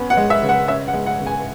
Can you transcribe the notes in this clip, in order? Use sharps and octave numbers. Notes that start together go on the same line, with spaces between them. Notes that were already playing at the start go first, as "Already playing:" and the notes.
Already playing: B3 C#4
F#5
G#3
E5
C#3
F#5
C#4 E5
F#5
G#3
F#5
C#3
G#5